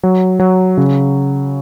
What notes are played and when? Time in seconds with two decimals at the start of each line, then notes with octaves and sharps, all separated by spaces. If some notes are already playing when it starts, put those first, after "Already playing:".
0.03 F#3
0.39 F#3
0.77 C#3